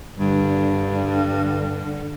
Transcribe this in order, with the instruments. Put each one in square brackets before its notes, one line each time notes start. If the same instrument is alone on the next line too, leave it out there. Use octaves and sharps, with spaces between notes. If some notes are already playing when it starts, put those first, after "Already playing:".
[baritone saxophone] G2 [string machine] D3